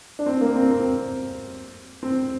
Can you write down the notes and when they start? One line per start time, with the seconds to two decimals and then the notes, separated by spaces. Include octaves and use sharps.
0.19 D4
0.26 C4
0.41 A#3
0.56 C4
0.71 C4
2.03 C4